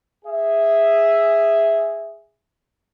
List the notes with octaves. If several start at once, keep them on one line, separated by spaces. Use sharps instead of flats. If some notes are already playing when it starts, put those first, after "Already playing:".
G#4 E5